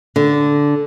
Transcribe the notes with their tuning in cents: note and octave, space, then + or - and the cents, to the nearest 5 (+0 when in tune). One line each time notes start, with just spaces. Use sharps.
D3 -10